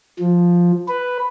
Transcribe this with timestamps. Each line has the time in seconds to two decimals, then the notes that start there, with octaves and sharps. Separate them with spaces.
0.19 F3
0.88 B4